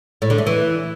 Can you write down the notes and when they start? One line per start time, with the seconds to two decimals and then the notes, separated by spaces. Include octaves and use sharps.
0.22 A2
0.30 D3
0.38 A3
0.47 E3